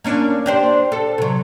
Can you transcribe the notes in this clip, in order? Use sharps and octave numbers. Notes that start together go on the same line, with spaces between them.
A#3 C#4 D4
D4 G4 C5
A4
C3 F#3